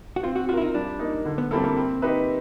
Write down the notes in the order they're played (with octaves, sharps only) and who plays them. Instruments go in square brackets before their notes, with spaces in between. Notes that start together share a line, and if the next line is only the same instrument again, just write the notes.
[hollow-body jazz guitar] F#4
[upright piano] C4 [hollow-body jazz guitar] F4
[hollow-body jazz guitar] F#4
[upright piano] F4 [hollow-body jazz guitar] F#4
[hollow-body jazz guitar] E4 [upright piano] A#4
[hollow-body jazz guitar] D#4
[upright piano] G3 [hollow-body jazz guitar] D4
[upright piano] A#3 D#4
D3
[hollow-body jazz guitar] B3
[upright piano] G3 C4 E4 A4 [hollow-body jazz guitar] A#3
[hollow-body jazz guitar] A#3
[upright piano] C4
D#4 G4 B4 E5